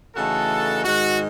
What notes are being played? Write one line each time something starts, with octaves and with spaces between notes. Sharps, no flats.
C#3 E3 A3 D#4 F#4 A4
G#2 D#3 G#3 D#4 F#4